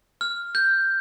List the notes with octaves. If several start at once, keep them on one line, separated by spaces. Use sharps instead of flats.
F6
G6